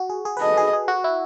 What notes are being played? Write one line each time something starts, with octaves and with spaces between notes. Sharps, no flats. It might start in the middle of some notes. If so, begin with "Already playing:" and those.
Already playing: F#4
G#4
G#4
B4
A4 D#5
G#4
G#4
F#4
E4